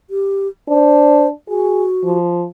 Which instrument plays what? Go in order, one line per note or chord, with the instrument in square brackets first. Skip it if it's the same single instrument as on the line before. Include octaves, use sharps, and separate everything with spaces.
[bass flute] G4
[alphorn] D4 [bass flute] C5
[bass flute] F#4 [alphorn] G#4
[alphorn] F3